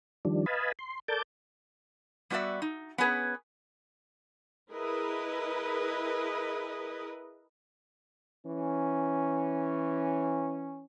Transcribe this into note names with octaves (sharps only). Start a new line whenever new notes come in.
D#3 F3 G3 D4
B4 D#5 F5 G#5 A5 B5
C6
A4 A#4 D5 A5 D6 G6
G3 B3 F#4 C#5 D5 E5
D#4
B3 C#4 G#4 B4
E4 G#4 A#4 B4 D#5
E3 C#4